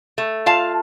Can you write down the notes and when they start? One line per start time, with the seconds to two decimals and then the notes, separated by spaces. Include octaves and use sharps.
0.18 A3
0.46 F4 F5 A5